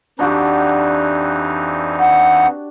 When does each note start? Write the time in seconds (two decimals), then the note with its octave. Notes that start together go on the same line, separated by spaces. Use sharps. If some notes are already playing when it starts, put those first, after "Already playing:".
0.19 F2 E3 D4 D#4 F#4 G4
1.99 F#5